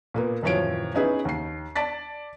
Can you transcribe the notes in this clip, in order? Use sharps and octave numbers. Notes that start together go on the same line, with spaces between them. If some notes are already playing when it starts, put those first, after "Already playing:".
A#2 A#3 B3
D#1 F#2 E3 F3 C#5 D7
B3 C#4 D#4 E4 G#4 B4
D#2 C7
D5 A5 A6 B6